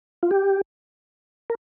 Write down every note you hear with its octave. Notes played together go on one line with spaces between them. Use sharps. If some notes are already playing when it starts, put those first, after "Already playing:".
F4
G4
A#4